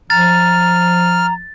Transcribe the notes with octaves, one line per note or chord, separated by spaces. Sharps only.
F3 A#5 F6 A6